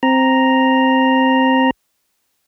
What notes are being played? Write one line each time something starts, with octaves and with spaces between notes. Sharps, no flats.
C4 A#5